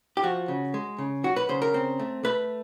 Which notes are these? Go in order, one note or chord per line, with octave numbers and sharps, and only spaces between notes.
G4
F3 F#4
C#3
G#3
C#3
F#3 F#4
B4
C#3 C5
A#4
C4
A3
A3 B4